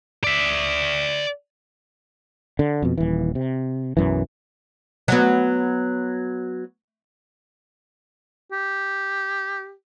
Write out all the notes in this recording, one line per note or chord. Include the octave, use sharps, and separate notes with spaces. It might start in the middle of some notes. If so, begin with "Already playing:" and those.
D5 E5
D3
F2 B2
D#1 E3
C3
B1 F#2 E3
F#3 B3
G4